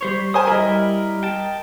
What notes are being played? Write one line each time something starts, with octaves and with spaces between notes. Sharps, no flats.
G3 C5 C#5
A#4 C5 G#5 D#6
G3 E4 A#4 D#5
G5 A5